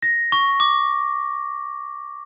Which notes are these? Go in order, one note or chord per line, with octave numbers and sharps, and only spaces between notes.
A#6
C#6
D6